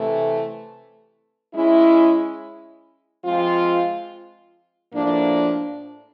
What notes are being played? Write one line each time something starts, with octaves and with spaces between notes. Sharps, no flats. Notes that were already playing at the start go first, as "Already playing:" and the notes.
Already playing: C3 E3 A3
G#3 C#4 E4
F3 G#3 C4 F4
A2 F3 A#3 D4